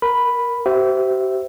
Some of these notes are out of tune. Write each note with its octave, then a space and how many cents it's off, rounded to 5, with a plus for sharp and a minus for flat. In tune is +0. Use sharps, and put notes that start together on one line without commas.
A#4 +10 B5 +0
G4 -40 C5 -15 E5 +0